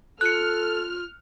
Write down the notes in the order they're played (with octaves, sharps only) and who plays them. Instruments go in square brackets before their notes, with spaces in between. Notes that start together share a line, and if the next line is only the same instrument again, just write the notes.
[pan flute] F4 [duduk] A4 [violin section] F6 [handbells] F#6 C#7